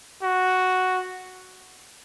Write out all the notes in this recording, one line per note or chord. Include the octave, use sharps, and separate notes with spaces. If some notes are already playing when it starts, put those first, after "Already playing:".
F#4